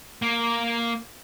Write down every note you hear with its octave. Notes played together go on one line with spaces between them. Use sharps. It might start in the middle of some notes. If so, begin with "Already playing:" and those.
A#3